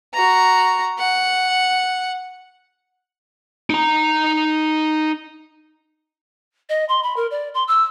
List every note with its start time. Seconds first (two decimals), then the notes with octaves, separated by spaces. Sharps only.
0.14 F#4 A#5
0.98 F#5
3.70 D#4 A#5
6.69 D#5
6.89 C6
7.03 B5
7.16 A#4
7.31 D5
7.54 C6
7.68 E6